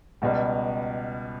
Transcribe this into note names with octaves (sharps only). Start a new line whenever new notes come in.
C#2 B2 G3